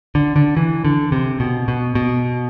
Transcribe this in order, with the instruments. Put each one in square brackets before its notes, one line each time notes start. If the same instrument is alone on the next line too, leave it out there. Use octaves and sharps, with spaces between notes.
[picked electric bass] D3
D3
E3
D3
C3
B2
B2
B2